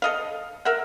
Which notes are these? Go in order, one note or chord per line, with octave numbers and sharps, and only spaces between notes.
A4 D#5 F5
A#4 E5 F#5